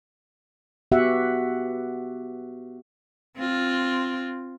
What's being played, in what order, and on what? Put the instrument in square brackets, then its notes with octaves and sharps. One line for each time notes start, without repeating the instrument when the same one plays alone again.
[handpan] B3 F#4 G4 E5 F#5
[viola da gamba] C4 F4